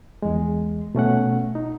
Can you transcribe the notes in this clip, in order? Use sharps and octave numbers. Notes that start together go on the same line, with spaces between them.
E2 G#3
B2 A3 C#4 F#5
D#4